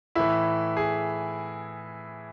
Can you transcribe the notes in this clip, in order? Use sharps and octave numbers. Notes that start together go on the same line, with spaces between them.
A2 E3 E4
G#4